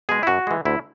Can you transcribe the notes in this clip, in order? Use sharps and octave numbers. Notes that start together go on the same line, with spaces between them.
B2 G#3 G#4
E4
F#2 F#4
E3 G#3
D2 E4